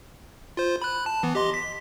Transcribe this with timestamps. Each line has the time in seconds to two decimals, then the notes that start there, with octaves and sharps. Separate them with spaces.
0.57 F4 C5
0.82 B5 F#6
1.06 A5
1.23 E3 B3
1.35 G4 D#5 C6
1.54 B6